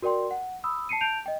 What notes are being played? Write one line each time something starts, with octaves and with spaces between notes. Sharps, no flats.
F#4 A#4 D5 G5 C6
F#5
B5 D#6 E6
A5 C7 C#7 D#7
A5 G6 D7 F7
D#5 G5